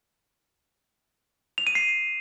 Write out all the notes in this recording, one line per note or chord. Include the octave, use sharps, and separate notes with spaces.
F7
D#7
C7